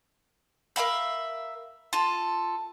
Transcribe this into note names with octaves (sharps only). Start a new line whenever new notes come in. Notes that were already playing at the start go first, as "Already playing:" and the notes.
A#4 E5 F5 B5
F4 A4